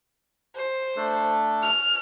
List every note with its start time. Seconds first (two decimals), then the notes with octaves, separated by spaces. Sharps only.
0.55 C5
0.96 A3 D4 A4
1.62 F6